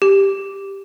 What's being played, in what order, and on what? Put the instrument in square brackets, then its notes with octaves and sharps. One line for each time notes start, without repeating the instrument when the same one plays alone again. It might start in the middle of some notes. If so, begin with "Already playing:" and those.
[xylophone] G4